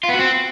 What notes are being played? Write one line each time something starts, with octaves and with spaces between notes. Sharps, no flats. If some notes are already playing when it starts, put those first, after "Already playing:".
F4
B3
F#4
C4